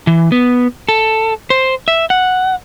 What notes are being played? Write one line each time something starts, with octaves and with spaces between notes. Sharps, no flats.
E3
B3
A4
C5
E5
F#5